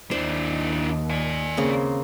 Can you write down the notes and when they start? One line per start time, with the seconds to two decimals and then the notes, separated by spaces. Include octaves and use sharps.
0.11 D#2 D4 E4 C5
1.10 D5 G#5
1.57 C#3 A#3 C4